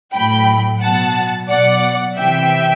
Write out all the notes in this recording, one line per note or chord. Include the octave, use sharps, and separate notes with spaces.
A2 F#3 G5 B5
B2 F#3 F#5 A5
B2 F#3 D5 F#5
C3 E3 E5 G5